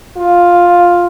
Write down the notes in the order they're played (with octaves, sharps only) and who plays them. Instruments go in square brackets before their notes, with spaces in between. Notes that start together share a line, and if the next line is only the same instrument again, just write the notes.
[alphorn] F4